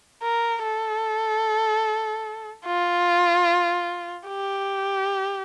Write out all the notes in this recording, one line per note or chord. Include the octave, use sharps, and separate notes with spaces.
A#4
A4
F4
G4